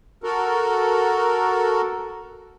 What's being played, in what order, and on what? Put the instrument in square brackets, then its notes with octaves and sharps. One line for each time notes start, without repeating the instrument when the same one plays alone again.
[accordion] F#4 A4 A#4